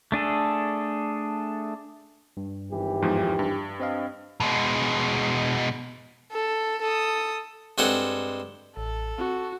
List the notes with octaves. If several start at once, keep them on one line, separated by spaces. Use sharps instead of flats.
A3 D4 G#4 A4
G2
G#1 E3 G4
E2 G#2 F3
G2
C4 D#5 F5
B2 G#3
A4
A4 D#6
G2 G#3 C4 A4 F#5 G#5
A1 A4
C4 F#4